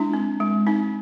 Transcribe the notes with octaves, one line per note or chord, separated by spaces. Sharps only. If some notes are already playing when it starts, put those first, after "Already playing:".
Already playing: G#3 D4 E4
C4
G#3
C4 D#4